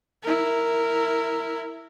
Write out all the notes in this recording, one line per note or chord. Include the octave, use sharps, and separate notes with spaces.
E4 A#4